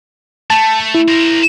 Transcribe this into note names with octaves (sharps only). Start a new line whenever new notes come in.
A3 A5
E4
A#4 C5